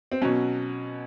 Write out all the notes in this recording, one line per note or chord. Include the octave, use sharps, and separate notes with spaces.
C4
B2 F#3 C#4